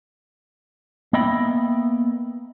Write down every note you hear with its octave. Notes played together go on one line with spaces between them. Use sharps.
A#3 B3 D#5 E5 G5 B5